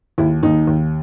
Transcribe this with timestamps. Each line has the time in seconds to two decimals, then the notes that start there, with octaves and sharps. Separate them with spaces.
0.18 D#2 E4
0.43 D#2 D#4
0.67 D#2